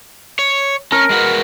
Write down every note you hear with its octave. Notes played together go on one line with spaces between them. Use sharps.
C#5
C#4 A#4
G#3 F#4 B4